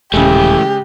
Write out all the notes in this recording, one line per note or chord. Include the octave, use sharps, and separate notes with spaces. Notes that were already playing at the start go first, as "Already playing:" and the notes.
D#1 C#3 E3 G#3 A3 G4